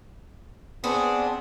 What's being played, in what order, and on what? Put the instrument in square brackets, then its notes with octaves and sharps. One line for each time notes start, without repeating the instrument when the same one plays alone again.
[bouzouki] B3 D4 [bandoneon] C4 G#4 D#6